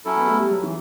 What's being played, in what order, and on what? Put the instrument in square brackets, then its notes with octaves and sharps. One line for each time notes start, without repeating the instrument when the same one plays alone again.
[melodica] F#3 C#4 E4 A4
[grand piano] B3
A3
G3
F#3
E3